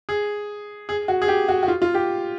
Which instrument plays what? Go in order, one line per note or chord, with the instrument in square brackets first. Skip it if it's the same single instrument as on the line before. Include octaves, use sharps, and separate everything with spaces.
[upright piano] G#4
G#4
F#4
G#4
G4
F#4
F#4
F4
F4
G4